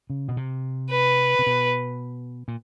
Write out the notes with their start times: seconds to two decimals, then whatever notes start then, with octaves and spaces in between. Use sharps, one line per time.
0.10 C#3
0.28 B2
0.37 C3
0.91 B4
1.39 C3
1.46 B2
2.48 A#2